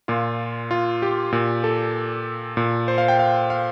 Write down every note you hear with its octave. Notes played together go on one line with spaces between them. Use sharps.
A#2 F4
F4
G4
A#2
A4
A#2
C5
F5
G5
F5
F5